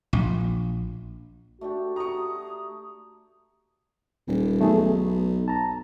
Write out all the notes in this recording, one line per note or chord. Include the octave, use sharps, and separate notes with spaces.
A#1
A3 D4 F#4 G4
A#5 C#6 D#6
D#1
B1 A3 G#4
B3
A5 A#5